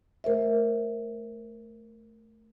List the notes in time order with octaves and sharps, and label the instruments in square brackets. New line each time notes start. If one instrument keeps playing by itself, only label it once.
[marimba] A3 A#4 C5 E5